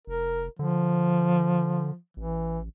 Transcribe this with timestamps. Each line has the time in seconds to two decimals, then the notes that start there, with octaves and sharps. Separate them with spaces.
0.07 F1 A#4
0.59 D3 F3
2.17 A1 E3